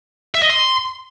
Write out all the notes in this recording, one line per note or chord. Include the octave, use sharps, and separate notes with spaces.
E5
D#5
C6